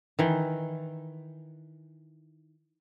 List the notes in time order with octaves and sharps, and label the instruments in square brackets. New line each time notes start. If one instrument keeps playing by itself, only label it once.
[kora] D#3 E3